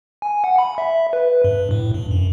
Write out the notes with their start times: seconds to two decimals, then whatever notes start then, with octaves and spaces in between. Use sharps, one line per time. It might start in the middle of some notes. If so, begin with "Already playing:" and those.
0.22 G#5
0.44 F#5
0.58 B5
0.78 E5
1.13 B4
1.44 G2
1.71 A2
1.94 G2
2.11 F#2